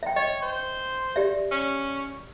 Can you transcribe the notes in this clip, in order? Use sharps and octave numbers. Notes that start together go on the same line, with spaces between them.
E5 G5
C#5 D#5
C5
G4 D5 E5
C#4